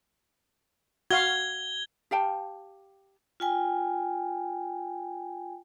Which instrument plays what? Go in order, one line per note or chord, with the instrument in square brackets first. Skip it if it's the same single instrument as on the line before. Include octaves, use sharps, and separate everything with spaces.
[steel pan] F#4 F5 [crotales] G#6 G7
[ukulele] G4 F5 G5 A5
[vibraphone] F4 G5 G#5